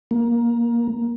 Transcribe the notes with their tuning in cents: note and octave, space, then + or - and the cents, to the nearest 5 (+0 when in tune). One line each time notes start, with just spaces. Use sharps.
A#3 +15